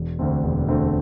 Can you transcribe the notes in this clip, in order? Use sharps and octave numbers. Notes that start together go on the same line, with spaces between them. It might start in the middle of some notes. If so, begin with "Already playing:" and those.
Already playing: E1
D2 D3 A3 C4
E1
D2 D3 A3 C4